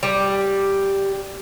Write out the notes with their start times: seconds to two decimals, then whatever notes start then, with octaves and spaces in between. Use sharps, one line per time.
0.03 G3